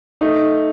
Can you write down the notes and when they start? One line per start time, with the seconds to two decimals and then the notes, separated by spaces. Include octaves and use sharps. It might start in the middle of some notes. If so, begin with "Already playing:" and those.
0.21 A3 D#4